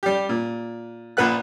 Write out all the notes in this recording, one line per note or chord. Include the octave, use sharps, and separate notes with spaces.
G3 G4
A#2
A#1 A#2 B4 F#5 F#6